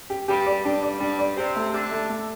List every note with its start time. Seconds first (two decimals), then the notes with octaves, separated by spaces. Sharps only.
0.10 G4
0.28 G2 G3 G4
0.46 D5
0.64 G2 G3 D4
0.83 D5
1.00 G2 G3 D4
1.19 D5
1.37 C3 C4 G4
1.56 A3
1.73 D3 D4 G4
1.91 A3
2.09 A3